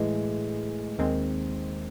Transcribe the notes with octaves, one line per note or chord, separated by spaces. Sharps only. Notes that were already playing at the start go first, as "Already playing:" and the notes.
Already playing: A2 E3 G#3
D#2 D#3 G#3 C4